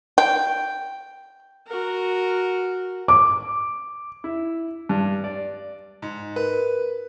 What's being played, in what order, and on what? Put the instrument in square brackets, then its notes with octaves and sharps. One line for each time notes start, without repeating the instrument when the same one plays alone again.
[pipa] G5
[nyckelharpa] F#4 A#4
[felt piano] D6
[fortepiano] E4
G2
D5
[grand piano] G#2
[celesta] A#4 [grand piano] B4